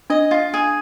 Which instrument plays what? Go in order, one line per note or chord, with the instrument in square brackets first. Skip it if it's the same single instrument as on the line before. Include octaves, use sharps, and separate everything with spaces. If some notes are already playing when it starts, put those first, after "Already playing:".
[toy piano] D4 [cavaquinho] D#5
[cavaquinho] F4
G#4